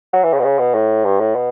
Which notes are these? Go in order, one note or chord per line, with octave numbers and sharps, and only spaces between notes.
F#3
E3
C#3
B2
C#3
B2
A2
G2
A2
B2